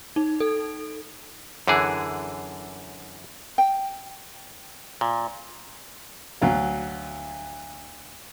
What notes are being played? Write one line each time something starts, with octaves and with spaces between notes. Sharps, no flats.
D#4
A4
F#2 D3 E3 G#4
G5
A#2
D2 F#3 F5